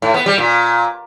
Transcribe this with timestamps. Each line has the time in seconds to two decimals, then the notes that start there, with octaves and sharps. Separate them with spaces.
0.02 A2
0.14 B3
0.26 G3
0.38 A#2